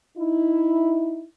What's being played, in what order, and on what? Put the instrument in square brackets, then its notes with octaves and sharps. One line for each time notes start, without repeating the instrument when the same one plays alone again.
[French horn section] D#4 E4